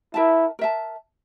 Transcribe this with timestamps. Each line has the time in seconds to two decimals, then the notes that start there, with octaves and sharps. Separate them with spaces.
0.14 E4 A#4 E5 A5
0.59 A#4 E5 A5